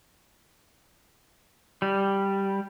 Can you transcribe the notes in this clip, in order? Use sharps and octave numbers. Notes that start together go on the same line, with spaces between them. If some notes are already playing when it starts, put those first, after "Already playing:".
G3